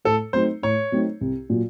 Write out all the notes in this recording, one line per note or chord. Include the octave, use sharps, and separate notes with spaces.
A2 A4
F#3 A3 C4 D#4 C5
A2 C#5
F#3 A3 C4 D#4
C2
A#2 F#3